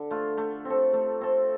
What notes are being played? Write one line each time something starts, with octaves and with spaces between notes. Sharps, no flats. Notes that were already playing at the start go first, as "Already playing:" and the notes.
Already playing: D3
A3 F4
A3
C4
A4
A3
C4 A4